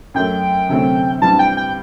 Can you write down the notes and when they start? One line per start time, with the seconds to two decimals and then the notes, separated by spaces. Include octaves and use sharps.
0.14 F#2 F#3 A3 G5
0.69 D2 C3 F#3 A3 C4
1.21 G2 E3 G3 C4 A5
1.39 G5
1.57 G5